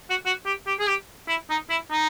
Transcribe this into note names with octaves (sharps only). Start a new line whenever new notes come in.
F#4
F#4
G4
G4
G#4
G4
E4
D#4
E4
D#4